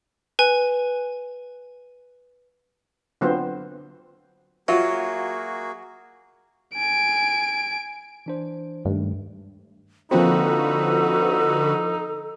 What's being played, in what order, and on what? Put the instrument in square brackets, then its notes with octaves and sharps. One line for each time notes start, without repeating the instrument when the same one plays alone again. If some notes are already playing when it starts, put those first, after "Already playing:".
[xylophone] B4 G#5
[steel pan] D3 F#3 B3 C4 F4 C5
[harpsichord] F#3 [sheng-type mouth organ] A#3 F#4 G#4 [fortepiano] F4 [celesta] E5
[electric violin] G#5 D7
[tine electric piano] E3 D4 C5
[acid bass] G2 [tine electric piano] D#3 G#3 A3
[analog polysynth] D3 F#4 B4 [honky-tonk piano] F3 A#3 C4 [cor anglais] D#4 [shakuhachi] A4